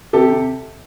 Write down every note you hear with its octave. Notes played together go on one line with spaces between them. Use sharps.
C3 G4 A4
C3